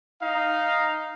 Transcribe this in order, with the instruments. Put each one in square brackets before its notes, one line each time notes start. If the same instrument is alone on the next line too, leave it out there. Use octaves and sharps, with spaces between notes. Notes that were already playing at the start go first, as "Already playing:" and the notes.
[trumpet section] D#4 F5